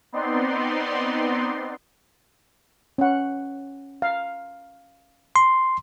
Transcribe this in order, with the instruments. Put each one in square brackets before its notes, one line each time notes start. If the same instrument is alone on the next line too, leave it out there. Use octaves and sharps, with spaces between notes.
[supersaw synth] B3 C4 D#4 D5 C6
[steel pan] C#4 F#5
F5
[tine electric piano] C6